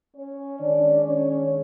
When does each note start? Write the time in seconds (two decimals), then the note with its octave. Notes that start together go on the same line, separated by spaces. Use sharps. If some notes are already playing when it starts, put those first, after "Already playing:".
0.14 C#4 C#5
0.58 D#3 G#3 C#4 D4 D5
1.03 C#4 C#5